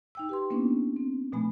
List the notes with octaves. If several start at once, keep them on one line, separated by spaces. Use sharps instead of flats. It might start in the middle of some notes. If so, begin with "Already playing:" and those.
D#4 G5 E6
G4 B4 C6
A#3 B3 C#4 D4 E4
C4
B2 F3 A3 G#5 B5